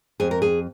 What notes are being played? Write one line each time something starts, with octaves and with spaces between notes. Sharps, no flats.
F2 G#4
A#4
G#4